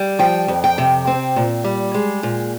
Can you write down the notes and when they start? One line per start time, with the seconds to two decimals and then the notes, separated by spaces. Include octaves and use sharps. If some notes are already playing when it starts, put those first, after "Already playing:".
Already playing: G3
0.19 F3 G5
0.48 F2
0.64 G5
0.78 C3
1.07 C4
1.36 A#2
1.64 G3
1.94 G#3
2.23 A#2